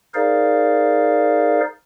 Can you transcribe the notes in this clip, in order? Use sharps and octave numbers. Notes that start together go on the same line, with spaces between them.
D#4 G#4 A#4 C5 D5 F5